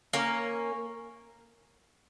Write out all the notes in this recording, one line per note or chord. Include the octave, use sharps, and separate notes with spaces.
A#3 C#4